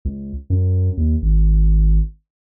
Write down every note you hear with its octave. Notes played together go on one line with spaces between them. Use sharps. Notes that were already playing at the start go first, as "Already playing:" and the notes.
C#2
F#2
D#2
G#1